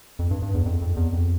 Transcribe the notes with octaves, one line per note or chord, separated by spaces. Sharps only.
F2
G2
G2
E2
F2
F2
E2
F2